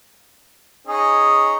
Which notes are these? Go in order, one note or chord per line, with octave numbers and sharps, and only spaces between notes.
C#4 D#4 G#4